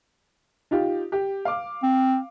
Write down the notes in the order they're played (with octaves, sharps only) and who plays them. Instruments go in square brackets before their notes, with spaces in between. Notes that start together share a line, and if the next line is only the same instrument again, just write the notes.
[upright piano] D#4 F4 G4
G4
F5 D6
[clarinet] C4